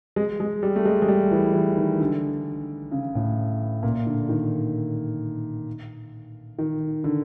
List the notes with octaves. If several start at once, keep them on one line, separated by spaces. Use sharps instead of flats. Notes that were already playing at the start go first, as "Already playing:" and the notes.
G#3
G#3
G3
A3
G#3
G#3
G3
E3
E3
D#3
D3
C#3
A2
A#2
D3
D#3
D#3
D3